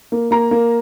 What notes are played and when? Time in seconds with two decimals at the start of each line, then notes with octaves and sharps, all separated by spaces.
0.12 A#3
0.31 A#3 A#5
0.51 A#3